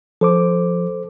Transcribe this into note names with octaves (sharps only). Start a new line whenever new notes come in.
F3 A4 C5 D6